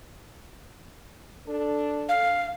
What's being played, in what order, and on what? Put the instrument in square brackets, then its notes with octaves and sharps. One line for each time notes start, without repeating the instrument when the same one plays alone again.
[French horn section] D4 A4
[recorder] F5